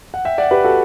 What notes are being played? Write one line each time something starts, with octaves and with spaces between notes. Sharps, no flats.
F#5
E5 G5
D5 F#5
G4 B4
F#4 A4